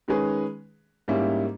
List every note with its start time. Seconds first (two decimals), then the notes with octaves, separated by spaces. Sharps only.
0.08 D#3 G#3 C#4 G#4 B4
1.08 G#2 G3 A#3 C#4 E4